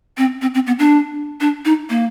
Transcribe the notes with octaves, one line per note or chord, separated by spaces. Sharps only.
C4
C4
C4
B3
D4
D4
D#4
A#3